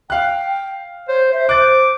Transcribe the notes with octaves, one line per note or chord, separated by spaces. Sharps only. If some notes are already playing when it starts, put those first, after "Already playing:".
F5 G5 F#6
C5 C#5
C5 E5
C5 D6 F#6 A6